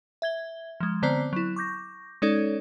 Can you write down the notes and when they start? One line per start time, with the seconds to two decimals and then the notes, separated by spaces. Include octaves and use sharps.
0.22 E5 G#6 G7
0.80 F3 G#3
1.02 D3 B3 C4 C5 D5 A#5
1.33 F#3 E4
1.56 C#6 D6 G6 A#6
2.22 G#3 C#4 D#4 A4 C#5 D5